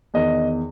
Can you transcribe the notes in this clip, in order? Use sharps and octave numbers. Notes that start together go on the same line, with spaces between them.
E2 D#3 D#5